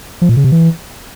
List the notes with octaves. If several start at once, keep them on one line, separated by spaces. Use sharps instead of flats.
F3
A#2
C#3
C3
E3